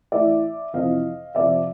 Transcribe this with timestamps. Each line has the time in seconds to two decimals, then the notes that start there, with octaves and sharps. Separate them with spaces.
0.12 A2 E3 D5 E5
0.73 F2 C3 E3 D#5 F5
1.35 F2 C3 F3 D5 E5